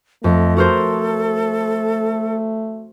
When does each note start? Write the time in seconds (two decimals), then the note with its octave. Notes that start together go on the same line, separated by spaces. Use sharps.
0.24 F2 A3 D#5
0.57 F#4 A4 A#4 C5